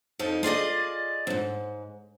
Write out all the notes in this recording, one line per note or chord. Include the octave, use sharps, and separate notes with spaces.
F2 F3 D#4
F4 G#4 D5 D#5
F2 G#2